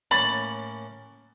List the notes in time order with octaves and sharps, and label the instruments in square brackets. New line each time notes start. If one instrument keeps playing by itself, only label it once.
[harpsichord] A2 A#3 C#4 [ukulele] B5 [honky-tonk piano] A6